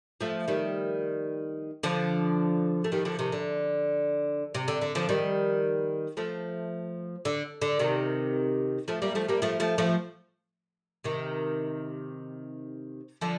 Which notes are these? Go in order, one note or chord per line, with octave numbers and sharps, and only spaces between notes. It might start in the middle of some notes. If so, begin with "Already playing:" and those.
F3 A3
D#3 G3
D3 F3
A3
D#3 G3
D3 F3
C3 D#3
D3
C3
D3
D3
D3 F3
D#3 G3
F3 A3
D3
D3
C3 D#3
F3 A3
G3 A#3
F3 A3
G3 A#3
F3 A3
F3 A3
F3 A3
C3 D#3
D3 F3